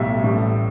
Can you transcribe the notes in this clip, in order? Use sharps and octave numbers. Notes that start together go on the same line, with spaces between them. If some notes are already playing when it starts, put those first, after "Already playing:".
Already playing: B1 A2 G3 E5
A1 A2 G3